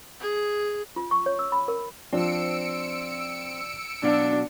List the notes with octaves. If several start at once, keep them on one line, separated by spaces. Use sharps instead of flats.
G#4
F4
C#6
C#5
E6
B5
A#4
F3 C4 D4 E6 C#7 D7
B2 F#3 D4 F5